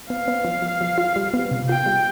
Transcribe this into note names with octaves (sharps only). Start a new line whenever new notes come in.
B3 F5
B3
F3
F3
F3
F4
G3
B3
C3
F4 G5
G3